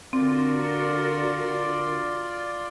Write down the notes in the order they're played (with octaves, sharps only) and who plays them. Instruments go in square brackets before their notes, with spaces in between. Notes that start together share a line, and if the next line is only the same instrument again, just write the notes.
[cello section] D3 F#4 A#4 [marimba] C4 [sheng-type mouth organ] F4 D5